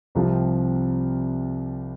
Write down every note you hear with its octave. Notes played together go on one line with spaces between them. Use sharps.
C2 C3 F3